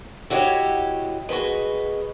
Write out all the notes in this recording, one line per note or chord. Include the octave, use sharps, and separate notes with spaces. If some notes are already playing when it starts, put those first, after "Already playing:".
E4 F#4 G4 C#5 D#5
F#4 G#4 B4 D#5